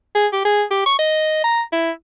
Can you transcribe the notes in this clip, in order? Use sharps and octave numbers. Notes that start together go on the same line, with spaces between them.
G#4
G4
G#4
G4
C#6
D#5
A#5
E4